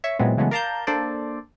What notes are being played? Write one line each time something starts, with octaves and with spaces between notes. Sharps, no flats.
C#5 E5 C#6
A#2 E3 F#3 G#3 B3 C4
C#3 E3 F#3 G#3 A3 B3
A#4 D5 F5 A5 A#5 G6
A#3 D4 A4 C5 D5